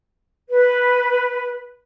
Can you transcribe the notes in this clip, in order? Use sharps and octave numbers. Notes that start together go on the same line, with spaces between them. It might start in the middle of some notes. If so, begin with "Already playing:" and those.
B4